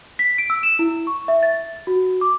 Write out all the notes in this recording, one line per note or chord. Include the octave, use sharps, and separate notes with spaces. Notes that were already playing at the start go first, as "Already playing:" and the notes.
B6
D7
E6
E7
E4
C#6
E5
A6
F#4
D6